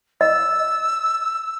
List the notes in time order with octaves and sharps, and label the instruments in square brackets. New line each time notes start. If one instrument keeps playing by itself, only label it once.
[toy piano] D#5 [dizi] E6